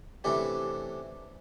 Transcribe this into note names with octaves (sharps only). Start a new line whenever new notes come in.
C3 E3 A3 C#4 D4 G4